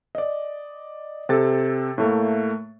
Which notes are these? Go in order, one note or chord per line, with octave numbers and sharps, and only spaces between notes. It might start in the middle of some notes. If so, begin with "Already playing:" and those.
D5 D#5
C3 C4 A4 A6
A2 A3 A#3